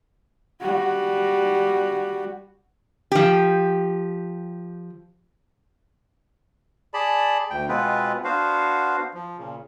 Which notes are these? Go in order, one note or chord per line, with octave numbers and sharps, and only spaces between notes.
G3 F#4
F3 G4
G#4 D5 A5 B5
D2 G5
B2 G#3 B3 C4 F4 B4
B3 D4 F#4 C5 F5
F3
A#2 C#3